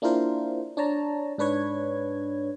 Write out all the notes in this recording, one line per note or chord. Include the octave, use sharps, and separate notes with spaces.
A#3 D4 E4 F4 A#4 C5
D4 C#5 A5 A#5
G#2 D4 B4 C#5 G#6